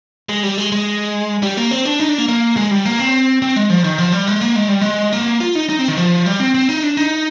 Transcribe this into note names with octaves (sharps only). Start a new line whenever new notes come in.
G#3
G3
G#3
G#3
G3
A#3
C4
D4
D#4
D4
A#3
A#3
G#3
G3
A#3
C4
C4
G#3
F3
D#3
F3
G3
G#3
A#3
G#3
G3
G#3
A#3
F4
D#4
D#4
C4
D#3
F3
G3
C4
C4
D#4
D4
D#4